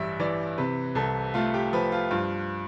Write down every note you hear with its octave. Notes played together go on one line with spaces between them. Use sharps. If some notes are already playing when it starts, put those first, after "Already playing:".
Already playing: A1 G2 G3 E5
E3 D5
C3 B4
C2 A4
A3 F4
G4
F3 B4
F4
G2 F4